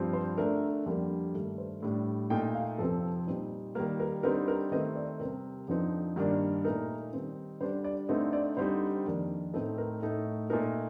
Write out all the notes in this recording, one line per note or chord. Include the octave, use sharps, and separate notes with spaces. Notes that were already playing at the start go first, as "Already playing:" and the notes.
Already playing: G2 F3 C4
C5
D3 A3 D4 A#4
F2 D3 G3 A#3
G2 D#3 A3
C5
A2 G3 D4
A#2 A3 D#4 G5
F5
F2 C3 F3 C4 A4
A#2 G3 C4 D#4
D#3 G3 A#3 A#4
A#4
D3 G3 C4 D#4 A#4
A#4
D#3 A3 C4 D#5
D5
C3 G3 C4 A#4
F2 D3 F3 C4 D#4
G2 D#3 A#3 D4
A#2 A3 D#4 A#4
D#3 G3 C4 D#4
D3 G3 D4 C5
D5
D3 A3 C4 D#4 D#5
D5
D3 G3 C4 D#4 C5
F2 D#3 A#3 D4
A2 A3 C4 D#4 A4
A#4
A2 A3 D#4
A#2 A3 D#4 A#4